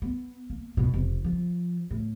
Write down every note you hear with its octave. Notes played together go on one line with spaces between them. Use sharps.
B3
A#3
B2
F1
F3
A2